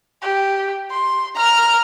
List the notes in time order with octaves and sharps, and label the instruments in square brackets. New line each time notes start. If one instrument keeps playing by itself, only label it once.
[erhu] G4
C6
[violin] A#5 [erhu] F6